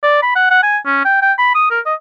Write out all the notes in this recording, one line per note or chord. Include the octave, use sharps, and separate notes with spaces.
D5
B5
F#5
F#5
G#5
C#4
G5
G5
B5
D#6
A#4
D#5